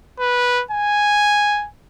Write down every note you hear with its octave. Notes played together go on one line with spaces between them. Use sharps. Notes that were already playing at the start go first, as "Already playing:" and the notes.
B4
G#5